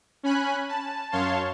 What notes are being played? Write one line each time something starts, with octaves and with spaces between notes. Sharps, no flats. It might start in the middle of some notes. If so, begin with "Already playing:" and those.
C#4 G#5 B5 F#6
A5
F#2 C#5 F5 A5 C6